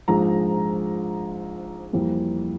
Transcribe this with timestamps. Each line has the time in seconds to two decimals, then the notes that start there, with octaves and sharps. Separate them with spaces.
0.08 A#1 G#2 F3 G#3 A#5
1.93 F2 E3 G3 A#3